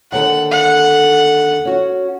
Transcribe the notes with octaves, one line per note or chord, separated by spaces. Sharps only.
D#2 D3 A4 F#5
F#5
C#4 F#4